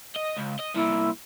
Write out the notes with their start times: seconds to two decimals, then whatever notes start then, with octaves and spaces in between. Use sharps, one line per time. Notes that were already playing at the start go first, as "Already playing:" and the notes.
0.16 D#5
0.38 C#2
0.60 D#5
0.75 C2 A#2 E4